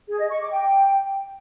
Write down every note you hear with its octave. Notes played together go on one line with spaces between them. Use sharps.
G#4
D#5
C#6
D6
G5